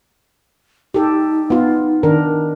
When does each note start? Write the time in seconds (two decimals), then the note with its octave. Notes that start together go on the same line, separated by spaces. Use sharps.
0.94 D#4 G4 A4
1.50 B3 F4
2.03 D#3 D4 A#4